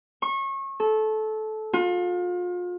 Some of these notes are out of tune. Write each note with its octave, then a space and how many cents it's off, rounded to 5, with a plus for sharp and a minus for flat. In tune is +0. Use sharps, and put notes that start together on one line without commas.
C#6 -30
A4 -20
F4 +35